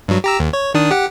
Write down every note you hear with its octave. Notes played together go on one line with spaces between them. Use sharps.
G2 F#3
G4 A#5 E6
D#2
C#5
D#3 D4 D#6
G4 F#5